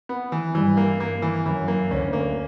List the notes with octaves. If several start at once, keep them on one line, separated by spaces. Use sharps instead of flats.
B3
E3
G2 E3 G3
A#3
A#3
E3
F#2 E3 F#3
A#3
D2 D3 C#4
A#3